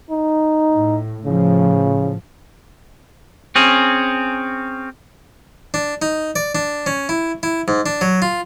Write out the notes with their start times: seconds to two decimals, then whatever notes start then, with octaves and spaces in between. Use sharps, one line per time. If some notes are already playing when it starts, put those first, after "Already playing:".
0.11 D#4
0.73 A2
1.25 A2 C#3 F3
3.56 C4 C#4 G#4
5.74 D4
6.02 D#4
6.36 D5
6.55 D4
6.86 C#4
7.09 E4
7.43 E4
7.68 G#2
7.86 D4
8.01 F#3
8.22 F4